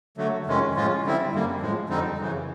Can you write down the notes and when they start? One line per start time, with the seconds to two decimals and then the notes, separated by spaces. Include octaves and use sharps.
0.17 D3 F#3 A3
0.46 F2 C3 D#3 G#3 C#4
0.75 A2 F3 G#3 C#4 F4
1.03 D3 G3 C4 E4
1.32 F#2 D3 G3 A#3
1.61 A2 F3 G#3
1.89 F2 D3 G3 C4 D#4
2.18 F#2 C#3 E3